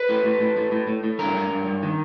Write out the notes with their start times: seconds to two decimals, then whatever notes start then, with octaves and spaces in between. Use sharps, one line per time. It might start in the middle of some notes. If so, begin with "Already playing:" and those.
Already playing: B4
0.09 A2
0.25 A2
0.40 A2
0.57 A2
0.72 A2
0.87 A2
1.04 A2
1.19 G2 A#4
1.35 G2
1.51 G2
1.66 G2
1.82 D#3